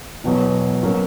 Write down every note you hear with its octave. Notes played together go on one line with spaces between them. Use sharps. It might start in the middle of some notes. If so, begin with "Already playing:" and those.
E1 E2 B2 F#3
B2 F#3 A#3 C#4 F#4